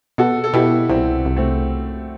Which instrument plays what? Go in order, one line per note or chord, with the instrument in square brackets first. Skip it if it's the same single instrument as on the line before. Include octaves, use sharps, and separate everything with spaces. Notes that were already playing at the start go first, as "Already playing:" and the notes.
[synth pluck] B2 [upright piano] F#4 A4
[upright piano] A4
[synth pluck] B2 [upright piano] E4 G4
[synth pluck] C2 [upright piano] C4 E4
[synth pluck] C2
[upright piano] A3 C4